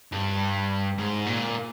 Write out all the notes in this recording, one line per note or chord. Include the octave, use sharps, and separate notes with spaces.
G2
G#2
A#2